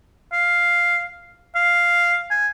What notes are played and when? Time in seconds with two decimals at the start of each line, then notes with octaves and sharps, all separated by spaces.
0.33 F5
1.55 F5
2.31 G#5